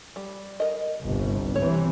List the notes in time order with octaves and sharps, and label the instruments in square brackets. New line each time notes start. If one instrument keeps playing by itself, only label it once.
[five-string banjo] G3
A#4 D#5
[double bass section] G1 C2
[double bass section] C3 E3 [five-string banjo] C#5